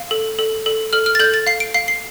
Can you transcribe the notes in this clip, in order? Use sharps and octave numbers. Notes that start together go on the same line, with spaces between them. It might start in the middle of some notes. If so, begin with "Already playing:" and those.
Already playing: F5
A4
A4
A4
A4 F6
F6
A6
A4 G6
A6
F5 C7
D7
F5 C7
C7